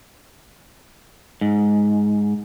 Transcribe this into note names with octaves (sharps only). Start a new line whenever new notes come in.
G#2